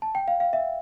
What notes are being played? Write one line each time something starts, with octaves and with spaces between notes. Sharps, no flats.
A5
G5
F5
F5
E5